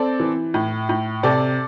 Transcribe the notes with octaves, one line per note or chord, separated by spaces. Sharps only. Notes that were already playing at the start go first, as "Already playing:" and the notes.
Already playing: C4 A4 D5
E3
A2
A2
C3 A4 D5